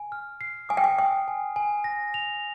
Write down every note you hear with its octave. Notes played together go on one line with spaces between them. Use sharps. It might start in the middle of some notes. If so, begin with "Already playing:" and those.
Already playing: G#5
F6
C7
G#5 D#6
G5
G#5
G5 D#6
G#5
G#5
A#6
F7